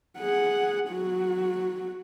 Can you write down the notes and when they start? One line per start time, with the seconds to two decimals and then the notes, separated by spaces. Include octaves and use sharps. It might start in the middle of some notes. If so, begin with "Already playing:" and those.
0.19 G#4 F#5
0.90 F#3 F#4